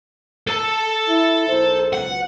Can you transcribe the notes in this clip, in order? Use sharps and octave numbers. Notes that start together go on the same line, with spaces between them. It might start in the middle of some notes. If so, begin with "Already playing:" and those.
A4 A5
E4
B1 A#4 C5
C#2 F#3 B3 F#5